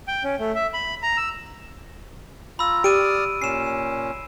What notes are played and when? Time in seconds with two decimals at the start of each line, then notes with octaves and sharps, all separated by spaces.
0.08 G5
0.24 C#4
0.39 A3
0.55 E5
0.74 B5
1.03 A#5
1.17 E6
2.59 F4 A#5 B5 E6
2.84 G4 D5 D#6 F6 D7 D#7
3.42 A#2 C#4 C7 E7